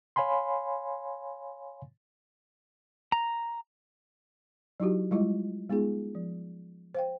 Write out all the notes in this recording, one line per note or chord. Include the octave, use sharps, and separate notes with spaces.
C#5 F5 G#5 B5 C6
A#5
F#3 D#4 E4 F#4 G4
G3 G#3 E4 F4 D#5
G#3 B3 D#4 F4 G#4
F3
C5 F5 G5